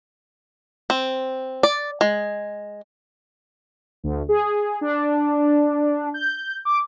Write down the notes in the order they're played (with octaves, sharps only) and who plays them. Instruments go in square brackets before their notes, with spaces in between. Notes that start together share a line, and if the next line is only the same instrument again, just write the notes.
[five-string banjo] C4
D5
G#3
[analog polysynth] D2
G#4
D4
G6
D6